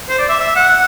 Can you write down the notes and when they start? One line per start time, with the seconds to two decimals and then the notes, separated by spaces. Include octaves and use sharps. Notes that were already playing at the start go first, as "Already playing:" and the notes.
0.09 C5
0.19 D5
0.29 E5
0.41 E5
0.56 F#5